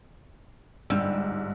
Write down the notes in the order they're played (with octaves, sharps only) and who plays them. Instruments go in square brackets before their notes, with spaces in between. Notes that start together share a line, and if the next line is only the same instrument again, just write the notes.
[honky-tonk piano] G1 G#2 E6 [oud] G3